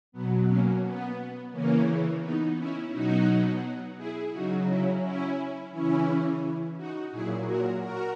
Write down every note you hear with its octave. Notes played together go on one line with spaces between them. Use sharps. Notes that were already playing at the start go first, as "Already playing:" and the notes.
B2 F#3 B3
A#3 C#4
B3
C#3 E3 A#3 C#4
B3 D#4
C#4 E4
B2 F#3 D#4 F#4
E4 G#4
C#3 F#3 D#4 F#4
C#4 E4
C#4 E4
C#3 E3 C#4 E4
D#4 F#4
A#2 F#3 E4 G#4
F#4 A#4
F#4 A#4